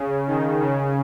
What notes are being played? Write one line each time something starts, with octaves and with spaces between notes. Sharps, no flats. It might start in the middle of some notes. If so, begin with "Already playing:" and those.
Already playing: C#3
D#3
C#3